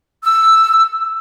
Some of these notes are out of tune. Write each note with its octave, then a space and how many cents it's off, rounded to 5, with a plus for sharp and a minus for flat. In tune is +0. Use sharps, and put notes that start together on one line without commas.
E6 +5